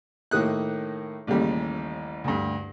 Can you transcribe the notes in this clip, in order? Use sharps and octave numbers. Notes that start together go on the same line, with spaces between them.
A2 D#3 A#3 D#6 F#6
A1 D#2 C#3 G3
D2 G2